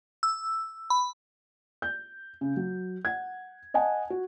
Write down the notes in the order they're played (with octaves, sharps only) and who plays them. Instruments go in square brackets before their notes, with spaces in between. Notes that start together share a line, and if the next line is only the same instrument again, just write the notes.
[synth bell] E6
B5
[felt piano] G6
C#3
F#3
F#5 G#6
D#5 F#5 G#5 A5
F#4